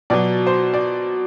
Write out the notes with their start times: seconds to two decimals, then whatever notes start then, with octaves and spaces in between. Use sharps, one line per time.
0.10 B2 F#3 D5
0.47 C5
0.74 D5